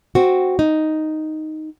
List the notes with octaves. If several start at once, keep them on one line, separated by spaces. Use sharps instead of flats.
C4 F#4
D#4